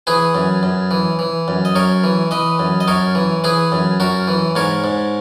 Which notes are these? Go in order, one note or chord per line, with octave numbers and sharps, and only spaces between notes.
E3 G#4 B4
F#2
F#2
E3
E3
F#2
D#5
F#2 A#4 C#5
E3
E3 B4 D#5
F#2
D#5
F#2 A#4 C#5
E3
E3 G#4 B4
F#2
F#2 F#4 A#4
E3
G#2 A#4 C#5
G#2